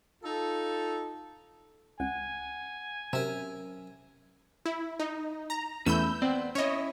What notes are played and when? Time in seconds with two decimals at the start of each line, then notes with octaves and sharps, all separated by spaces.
0.24 D#4 F4 A4
2.00 C#2 F#5 G#5
3.13 C3 F#3 C#4 A#4 E5
4.66 E4
5.00 D#4
5.50 A#5
5.86 E2 E3 A3 C#4 B5 E6 G6
6.22 B3 C4 D5
6.55 C#4 E4 C#5 D#5